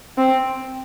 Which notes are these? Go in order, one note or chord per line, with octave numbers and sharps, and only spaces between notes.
C4